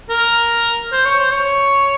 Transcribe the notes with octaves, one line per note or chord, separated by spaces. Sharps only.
A#4
C5
C#5
C5
C#5